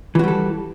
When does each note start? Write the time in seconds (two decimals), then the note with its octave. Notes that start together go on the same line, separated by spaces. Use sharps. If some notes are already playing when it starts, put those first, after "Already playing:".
0.15 E3
0.19 F#4
0.24 G3
0.28 A4